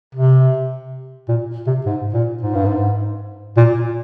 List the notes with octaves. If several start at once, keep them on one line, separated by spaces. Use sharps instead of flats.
C3
A#2
C3
G#2
A#2
G#2
G2
G#2
A#2